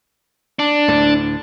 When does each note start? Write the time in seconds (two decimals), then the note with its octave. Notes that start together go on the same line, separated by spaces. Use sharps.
0.59 D4
0.88 D2 A2 D3